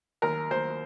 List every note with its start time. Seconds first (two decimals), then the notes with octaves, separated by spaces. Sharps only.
0.22 D#2 A#4
0.51 D#2 C5